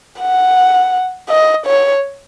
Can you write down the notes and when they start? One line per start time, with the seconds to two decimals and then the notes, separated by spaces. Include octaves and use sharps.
0.20 F#5
1.29 D#5
1.66 C#5